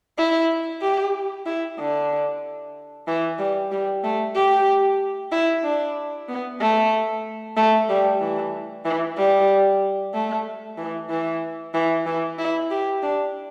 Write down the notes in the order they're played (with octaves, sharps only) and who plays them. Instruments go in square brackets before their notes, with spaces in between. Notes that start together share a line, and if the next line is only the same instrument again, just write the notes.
[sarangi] E4
G4
E4
D3
E3
G3
G3
A3
G4
E4
D4
B3
A3
A3
G3
E3
E3
G3
A3
E3
E3
E3
E3
E4
G4
D4